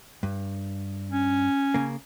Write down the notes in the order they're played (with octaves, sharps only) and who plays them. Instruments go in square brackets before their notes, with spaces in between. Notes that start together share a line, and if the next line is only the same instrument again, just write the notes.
[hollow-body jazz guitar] G2
[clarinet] C#4
[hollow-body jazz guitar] C#3 A#3